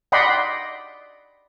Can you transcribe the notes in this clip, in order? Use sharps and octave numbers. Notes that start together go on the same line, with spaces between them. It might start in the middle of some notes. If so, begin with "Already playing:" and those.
D5 D#5 F#5 G5 B5 C6